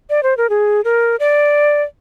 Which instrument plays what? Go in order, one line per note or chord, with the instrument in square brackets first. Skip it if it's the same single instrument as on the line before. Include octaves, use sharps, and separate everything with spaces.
[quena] D5
C5
A#4
G#4
A#4
D5